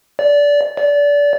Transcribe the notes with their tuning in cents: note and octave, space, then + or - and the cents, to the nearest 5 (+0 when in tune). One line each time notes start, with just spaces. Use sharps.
D5 -20
D5 -25